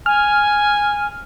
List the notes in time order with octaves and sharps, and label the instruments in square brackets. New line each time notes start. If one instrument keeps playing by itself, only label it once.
[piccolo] G#5 [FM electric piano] F6